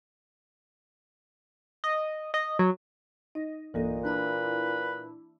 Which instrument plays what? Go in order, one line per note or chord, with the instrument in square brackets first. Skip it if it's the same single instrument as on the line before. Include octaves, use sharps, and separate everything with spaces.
[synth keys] D#5
D#5
F#3
[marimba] D#4 [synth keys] D#5
[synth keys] B1 G2 D#5 [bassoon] A#2 [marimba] E3 A#3 A4
[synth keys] D4 E4 [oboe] B4 [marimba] A#5